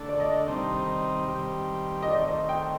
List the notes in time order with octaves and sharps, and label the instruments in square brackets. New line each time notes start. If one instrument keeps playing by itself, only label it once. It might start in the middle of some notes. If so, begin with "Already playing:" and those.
Already playing: [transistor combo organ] D3 A3 D4 A4
[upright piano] D5
D#5
[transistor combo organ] C3 D#3 G3 C4 D#4
D#3 G3 C4 G4
[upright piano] D#5
[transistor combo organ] D#3 A3 C4 [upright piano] D5
[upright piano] D#5
G5